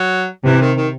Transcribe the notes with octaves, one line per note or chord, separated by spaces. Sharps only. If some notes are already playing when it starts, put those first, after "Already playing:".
Already playing: F#3
C3 E3
D#3
D#3